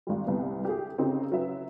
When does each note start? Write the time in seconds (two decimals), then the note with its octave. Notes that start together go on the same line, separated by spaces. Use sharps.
0.07 G#1 G3
0.27 C2 C3 B3
0.65 G4 G#4
0.98 C#3 C4 D#4 G4
1.32 F#3 B4 E5